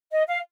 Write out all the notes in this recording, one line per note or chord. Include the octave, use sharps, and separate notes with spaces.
D#5
F5